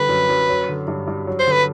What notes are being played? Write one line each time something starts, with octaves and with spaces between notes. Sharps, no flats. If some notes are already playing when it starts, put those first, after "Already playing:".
Already playing: D3 G3 B4
F#2
F#2
F#3
D3
G2
G2
F#3
C5
D3 B4